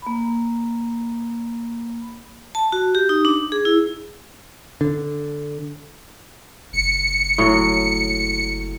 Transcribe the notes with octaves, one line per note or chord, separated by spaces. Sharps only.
A#3 B5
A5
F#4
G4
D#4
D4
G#4
E4
D3
F#1 C#7
A2 F#3